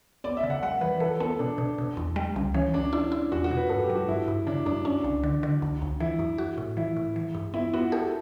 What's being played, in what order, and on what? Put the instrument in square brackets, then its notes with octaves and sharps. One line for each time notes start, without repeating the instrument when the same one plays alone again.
[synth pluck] B3 [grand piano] D5
[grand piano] E5
[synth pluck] C#3
[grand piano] F#5
[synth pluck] G3 [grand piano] F#5
[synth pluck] E3 [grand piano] B4
[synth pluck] E3 [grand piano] A4
[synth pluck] B3 [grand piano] A4
[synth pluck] B2 [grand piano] D4
[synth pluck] B2
B2
E2
G3
C#2
[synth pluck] E3 [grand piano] C#4
[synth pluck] D2 [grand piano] D4
[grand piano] D4 [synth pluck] E4
[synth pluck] E4
[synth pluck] E2 [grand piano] F#4
[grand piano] F#4
[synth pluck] B2
[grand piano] B4
[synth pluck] G2 [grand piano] A4
[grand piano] G4
[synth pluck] F#3
[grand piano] F#4
[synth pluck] G2 [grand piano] E4
[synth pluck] G2
[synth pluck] C#3 [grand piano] D4
[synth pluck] F#2 [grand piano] D4
[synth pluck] C#4 [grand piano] D4
[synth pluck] C#2
D3
D3
D2
D2
[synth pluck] E3 [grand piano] E4
[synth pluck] F#2
F#4
A2
[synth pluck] E3 [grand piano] E4
[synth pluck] A2
E3
G2
[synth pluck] B3 [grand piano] E4
[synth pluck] B3 [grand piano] F#4
[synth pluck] G4 [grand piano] A4